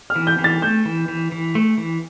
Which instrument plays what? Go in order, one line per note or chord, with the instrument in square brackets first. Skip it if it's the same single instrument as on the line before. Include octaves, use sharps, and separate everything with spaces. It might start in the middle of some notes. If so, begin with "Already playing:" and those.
[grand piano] F6
[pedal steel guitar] E3
[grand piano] G6
[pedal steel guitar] E3
[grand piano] A6
[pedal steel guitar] A3 [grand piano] G6
[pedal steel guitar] E3
E3
E3
A3
E3